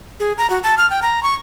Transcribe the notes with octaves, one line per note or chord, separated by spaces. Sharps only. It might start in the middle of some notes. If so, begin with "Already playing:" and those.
G#4
A#5
F#4
A5
F6
G5
A#5
C#6